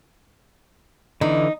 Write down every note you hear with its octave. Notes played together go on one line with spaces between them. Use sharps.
D3 E3 D#4